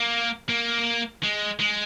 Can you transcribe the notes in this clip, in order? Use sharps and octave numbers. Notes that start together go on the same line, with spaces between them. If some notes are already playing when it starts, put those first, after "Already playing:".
Already playing: A#3
A#3
G#3
G#3